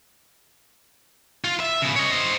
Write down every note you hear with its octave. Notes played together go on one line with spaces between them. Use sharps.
F4
E5
C#3 B3
C#5 D#5
C5 D#5